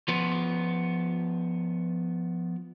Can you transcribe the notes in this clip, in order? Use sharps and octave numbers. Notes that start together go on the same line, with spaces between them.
F3 B3